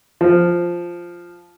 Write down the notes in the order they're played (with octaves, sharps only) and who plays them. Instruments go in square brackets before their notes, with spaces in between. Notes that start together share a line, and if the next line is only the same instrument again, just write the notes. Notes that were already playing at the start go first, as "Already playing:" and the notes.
[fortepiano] F3